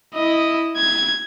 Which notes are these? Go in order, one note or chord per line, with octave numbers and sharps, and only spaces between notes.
E4 D#5
G#6